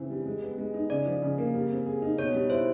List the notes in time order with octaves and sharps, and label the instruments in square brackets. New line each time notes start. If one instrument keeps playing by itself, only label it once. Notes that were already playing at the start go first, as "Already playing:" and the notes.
Already playing: [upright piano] C#3 E3 C4
G3
G#3
B3
G#3
D#4
[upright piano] C#3 [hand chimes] D5
[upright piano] F3
C#3
A#3
G3
C4
G#4
D#4
[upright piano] B2 [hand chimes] C#5
[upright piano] G3
[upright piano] E4 [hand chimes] C5